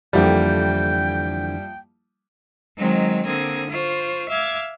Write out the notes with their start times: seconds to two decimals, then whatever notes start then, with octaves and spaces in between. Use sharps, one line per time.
0.13 F2 D3 E3 F3 G3 A#3 E4 G5
2.77 D#3 F#3 G#3 C4
3.25 D3 A#3 C4 D#6 G#6
3.69 F4 C5 C#6
4.29 E5 F5 D6 G#6